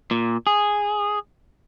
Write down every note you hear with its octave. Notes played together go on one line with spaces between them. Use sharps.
A#2
G#4